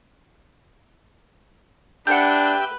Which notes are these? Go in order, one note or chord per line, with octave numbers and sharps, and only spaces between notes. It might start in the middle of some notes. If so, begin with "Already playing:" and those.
D4 G4 B4 E5 F#5 G5 G6